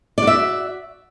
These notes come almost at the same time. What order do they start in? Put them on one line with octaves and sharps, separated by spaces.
D5 F#4 E5